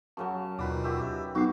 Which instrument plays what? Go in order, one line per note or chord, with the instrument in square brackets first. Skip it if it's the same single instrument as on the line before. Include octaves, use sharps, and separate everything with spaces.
[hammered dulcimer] F#2 C#3 F#3 [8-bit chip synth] A5
[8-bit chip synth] D#2 B2 F4 [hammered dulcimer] D#3 B4 D5
[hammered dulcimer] F#2 G4 E5
[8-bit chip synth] G4 [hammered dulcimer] E5
[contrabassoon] B1 [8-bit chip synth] D#4 D6 C7 [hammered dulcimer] F#4